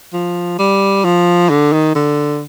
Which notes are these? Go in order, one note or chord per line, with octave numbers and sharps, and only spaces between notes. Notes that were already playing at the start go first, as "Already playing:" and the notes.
F3
G3
F3
D3
D#3
D3